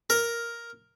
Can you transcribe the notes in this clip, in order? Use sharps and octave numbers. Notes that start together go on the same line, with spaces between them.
A#4